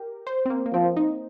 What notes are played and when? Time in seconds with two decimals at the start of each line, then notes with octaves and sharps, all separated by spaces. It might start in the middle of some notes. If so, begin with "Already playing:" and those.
Already playing: G4 A#4
0.27 C5
0.46 C4
0.50 A#3
0.66 A#3
0.73 F3 C4
0.97 D#4